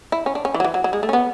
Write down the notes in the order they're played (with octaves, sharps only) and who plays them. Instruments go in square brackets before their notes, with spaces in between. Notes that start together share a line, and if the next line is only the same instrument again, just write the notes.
[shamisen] E4
C#4
D4
C#4
E3
F#3
E3
F#3
F#3
G#3
A3
C#4
B3